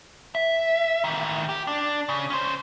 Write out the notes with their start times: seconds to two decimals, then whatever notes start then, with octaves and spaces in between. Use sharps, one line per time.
0.35 E5
1.04 D#3 E3
1.49 G4
1.67 D4
2.09 C#3
2.30 C#4 C5